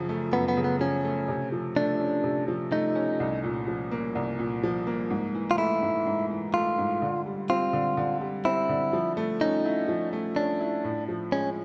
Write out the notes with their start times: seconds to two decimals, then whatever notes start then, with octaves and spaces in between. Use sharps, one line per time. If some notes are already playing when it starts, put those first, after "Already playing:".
Already playing: F#2 C#3 F3
0.09 A3
0.33 F#2 B3
0.48 B3
0.57 C#3
0.64 B3
0.81 F3 C#4
1.04 A3
1.28 C3
1.52 F3
1.76 A3 D4
2.00 C#4
2.24 C3
2.48 F3
2.72 A3 D#4
2.95 C#4
3.20 C2
3.44 A#2
3.68 F3
3.91 A#3
4.15 C2
4.39 A#2
4.63 F3
4.87 A#3
5.10 G#2
5.35 E3
5.51 F4
5.58 A3 E4
5.82 G#2
6.06 G#2
6.30 E3
6.54 A3 F4
6.78 G#2
7.02 D3
7.26 G3
7.50 C4 F4
7.73 D3
7.97 D3
8.21 G3
8.45 C4 E4
8.69 D3
8.93 F3
9.17 A3
9.41 C#4 D#4
9.65 E4
9.88 F3
10.13 A3
10.36 C#4 D4
10.60 E4
10.84 A2
11.09 F3
11.32 G#3 C#4